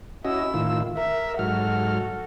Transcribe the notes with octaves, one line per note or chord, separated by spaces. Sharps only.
C#4 E4 F#4 D#5 E6
A2 D#3 F4
A#4 E5
G#2 F#3 F#4 A4 F6